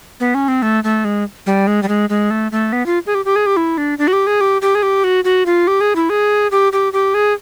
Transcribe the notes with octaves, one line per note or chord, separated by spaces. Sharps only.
B3
C#4
C4
A3
A3
G#3
G3
G#3
G3
G#3
G#3
A3
A3
B3
F4
G#4
G4
G4
G#4
G4
E4
D4
D4
F#4
G4
G#4
G4
G4
G#4
G4
F#4
F#4
F4
G4
G#4
E4
G#4
G4
G4
G4
G#4